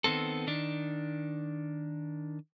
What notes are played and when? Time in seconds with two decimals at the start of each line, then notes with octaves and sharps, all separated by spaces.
0.04 D#3 B3 C4 A4
0.47 D#3 D4